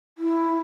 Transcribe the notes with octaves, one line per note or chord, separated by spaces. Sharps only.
E4